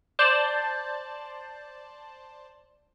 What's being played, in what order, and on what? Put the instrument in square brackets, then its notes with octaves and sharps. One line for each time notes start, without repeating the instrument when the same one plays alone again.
[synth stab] C5 D5 A5